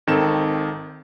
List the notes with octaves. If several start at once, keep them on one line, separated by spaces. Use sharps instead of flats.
G#1 D#3 C4 A4 E7